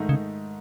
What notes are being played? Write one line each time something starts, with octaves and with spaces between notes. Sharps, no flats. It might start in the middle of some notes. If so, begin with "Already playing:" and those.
Already playing: G#2 D#3 A3 D#4
C#3